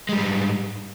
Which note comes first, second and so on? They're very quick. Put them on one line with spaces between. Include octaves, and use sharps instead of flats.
G#3 G3 G#2